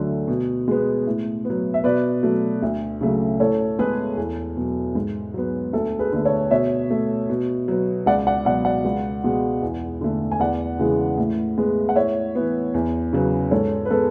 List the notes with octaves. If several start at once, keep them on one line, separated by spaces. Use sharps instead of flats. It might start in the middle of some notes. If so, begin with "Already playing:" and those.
Already playing: D2 D3 F#3 A3
B2
G#3 B3
A2
B3
F#3
E5
B2 B4 D5
F#3 A3
D2
C#3 F#3 A3
A2 A4 C#5
G#3 B3 G#4 B4
E2 A4
B2 F#3
G#2
F#3 B3
D2 A4
G#4 B4
D3 A3
A4 C#5
B2 C#5 E5
A3
B2
F#3 B3
C#2 D5 F#5
D5 F#5
B2 F#3 D5 F#5
D5 F#5
C#2
B2 G#3
E2
D3 A3
G#5
E2 D5 F#5
C#3 E3 G#3
A2
G#3 B3
F#5
A2 C#5 E5
E3 B3
E2
C#3 F#3 B3
G#2 A4 C#5
B4
G#3 B3 A4